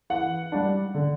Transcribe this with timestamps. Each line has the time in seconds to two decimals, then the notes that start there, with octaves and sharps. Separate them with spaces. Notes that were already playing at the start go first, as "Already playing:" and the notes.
0.10 E3 F#5
0.52 G3 D4
0.95 D3